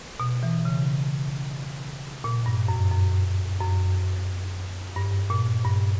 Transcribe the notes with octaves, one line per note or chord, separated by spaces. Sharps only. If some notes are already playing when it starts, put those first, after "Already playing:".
B2
E3
C#3
A#2
G2
F#2
F#2
F#2
G2
A#2
G2